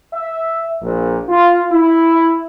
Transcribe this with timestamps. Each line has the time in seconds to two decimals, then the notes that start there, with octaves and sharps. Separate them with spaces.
0.13 E5
0.81 A#1
1.28 F4
1.71 E4